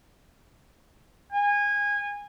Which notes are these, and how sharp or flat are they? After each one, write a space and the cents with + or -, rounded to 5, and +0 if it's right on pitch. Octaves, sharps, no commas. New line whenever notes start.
G#5 -20